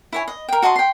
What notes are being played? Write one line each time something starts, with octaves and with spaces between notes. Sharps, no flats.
E4 C#5 G#5
D#5
A#4 G5
F#4 D#5 A5 C6
G5 C6